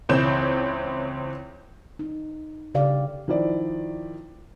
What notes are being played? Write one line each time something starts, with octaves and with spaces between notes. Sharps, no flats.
C#2 E3 C4 C#4 G6 E7
D#4
C#3 G4 D5 F5
D#3 F3 E4 D5